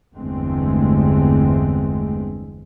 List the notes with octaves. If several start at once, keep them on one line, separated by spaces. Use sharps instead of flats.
G1 E2 D3 G#3 A3 C4